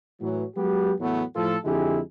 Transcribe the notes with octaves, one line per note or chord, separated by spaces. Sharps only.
A2 E3 F#3
F#3 G#3 B3 G4
E2 A2 F#3 A3 B3
A2 F3 F4 A4
F2 D3 G#3 E4 G4 G#4